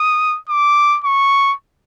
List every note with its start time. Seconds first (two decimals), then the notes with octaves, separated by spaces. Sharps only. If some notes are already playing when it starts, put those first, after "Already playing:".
Already playing: D#6
0.49 D6
1.04 C#6